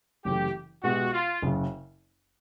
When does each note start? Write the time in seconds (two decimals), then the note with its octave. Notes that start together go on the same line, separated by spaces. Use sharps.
0.25 F#1 F#2 C#3 E3 A3 G4
0.84 B2 G#3 B3 E4 F#4 G4
1.13 F4
1.42 F#1 F#2 C#3